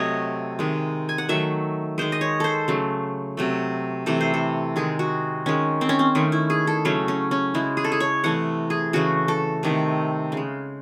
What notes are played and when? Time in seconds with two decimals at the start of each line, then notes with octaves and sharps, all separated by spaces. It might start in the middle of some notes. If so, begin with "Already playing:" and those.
Already playing: C3 F#3 A3 C#5 D#5 F#5
0.59 C3 D#3 G#3
1.09 G#5
1.18 F#5
1.29 D#3 F#3 A3 E5
1.98 D#3 G#3 C5
2.12 D#5
2.21 C#5
2.40 A4 C5
2.68 C#3 F#3 A3
3.37 C3 F#3 A3
4.06 C3 E3 A3 A4
4.21 C5
4.34 A4
4.76 D#3 G#3 G#4
4.99 F#4
5.46 D#3 G#3 C#4
5.81 C4
5.89 C#4
5.99 C4
6.15 D#3 A3 C#4
6.32 E4
6.50 G#4
6.67 A4
6.85 C#3 F#3 A3 C#4
7.08 C#4
7.31 C#4
7.54 C#3 G#3 E4
7.77 G#4
7.84 A4
7.92 G#4
8.00 C#5
8.24 C3 E3 A3 F#5
8.70 G#4
8.93 C#3 E3 A3 F#4
9.28 A4
9.63 C3 D#3 A3
10.32 C#3
10.37 G#3